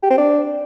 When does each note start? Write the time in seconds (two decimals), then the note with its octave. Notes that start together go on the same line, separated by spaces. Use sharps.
0.03 G4
0.10 C4
0.18 D4